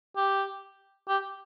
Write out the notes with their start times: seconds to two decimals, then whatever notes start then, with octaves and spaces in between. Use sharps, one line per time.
0.17 G4
1.08 G4